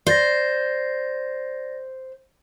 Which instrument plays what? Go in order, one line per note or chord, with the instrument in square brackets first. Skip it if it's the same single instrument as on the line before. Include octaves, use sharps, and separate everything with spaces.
[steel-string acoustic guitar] C5 [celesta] D5 A6 A#6